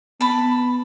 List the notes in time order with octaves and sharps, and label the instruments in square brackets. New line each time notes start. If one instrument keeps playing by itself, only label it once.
[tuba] B3 [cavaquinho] A5 B5